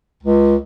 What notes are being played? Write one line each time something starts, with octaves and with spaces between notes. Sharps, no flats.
C#2